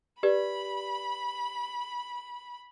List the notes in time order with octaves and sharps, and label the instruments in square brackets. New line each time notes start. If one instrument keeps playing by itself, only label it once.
[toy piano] G4 B4 D5 [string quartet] B5